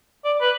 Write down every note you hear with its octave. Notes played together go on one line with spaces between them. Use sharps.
D5
B4